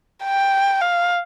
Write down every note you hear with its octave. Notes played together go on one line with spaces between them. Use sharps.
G5
F5